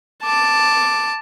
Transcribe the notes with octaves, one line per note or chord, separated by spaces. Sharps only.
A5 D6